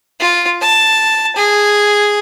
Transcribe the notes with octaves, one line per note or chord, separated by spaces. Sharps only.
F4
A5
G#4